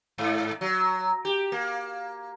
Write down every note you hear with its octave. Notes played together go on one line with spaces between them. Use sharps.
G#2
F#3
G4
A#3